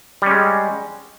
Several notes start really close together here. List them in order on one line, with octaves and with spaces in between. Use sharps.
G3 C#4 G#3